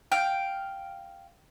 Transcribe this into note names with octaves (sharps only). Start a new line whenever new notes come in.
F5 G5